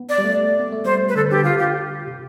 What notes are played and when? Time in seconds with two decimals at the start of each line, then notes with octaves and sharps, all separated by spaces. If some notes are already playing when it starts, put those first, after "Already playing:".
Already playing: B3
0.09 D5
0.18 G3
0.24 A3
0.59 B3
0.72 A3
0.85 G3 C5
1.09 B4
1.16 D3 A4
1.31 D3 G4
1.44 F4
1.58 G4
2.08 C3